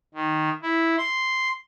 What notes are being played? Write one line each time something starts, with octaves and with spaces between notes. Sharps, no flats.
D#3
E4
C6